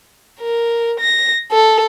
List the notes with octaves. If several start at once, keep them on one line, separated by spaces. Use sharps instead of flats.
A#4
A#6
A4